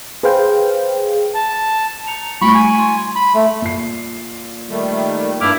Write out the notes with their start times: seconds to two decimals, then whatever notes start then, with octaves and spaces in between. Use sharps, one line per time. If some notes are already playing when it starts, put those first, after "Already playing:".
0.23 G#4 B4 C5 F5 G5
1.34 A5
2.07 A#5 C#7 F7
2.42 G3 A3 B5 C#6 D7
2.55 G#5
2.79 C6
3.16 B5
3.34 A3
3.62 A#2 C7
4.69 D#3 G3 A3
5.41 G2 A#3 E4 D6 F6